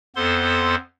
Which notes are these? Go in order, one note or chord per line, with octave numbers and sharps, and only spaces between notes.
F2 B3 A4 C5 C6